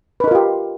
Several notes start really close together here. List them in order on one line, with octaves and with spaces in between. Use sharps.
B4 D#4 A#4 F4 G4